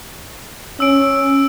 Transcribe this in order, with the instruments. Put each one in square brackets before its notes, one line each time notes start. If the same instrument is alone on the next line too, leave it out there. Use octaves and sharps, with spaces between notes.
[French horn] C#4 [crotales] E6 D7